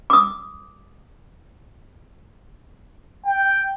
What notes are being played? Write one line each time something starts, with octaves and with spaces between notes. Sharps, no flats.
D6 D#6
G5